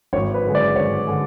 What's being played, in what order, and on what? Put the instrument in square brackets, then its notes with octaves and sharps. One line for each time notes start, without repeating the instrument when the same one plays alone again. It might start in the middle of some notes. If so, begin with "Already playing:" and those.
[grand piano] G#1 C#5
B4
F#2 D3 G#3
D5
G#1 C#5
D3 G#3